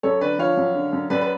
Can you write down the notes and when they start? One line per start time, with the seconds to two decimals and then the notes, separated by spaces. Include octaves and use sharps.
0.03 F#2 A4 C#5
0.21 D3 B4 D5
0.39 F3 C#5 F5
0.57 F#2
0.74 D3
0.93 F#2
1.10 F#2 B4 D5
1.21 B4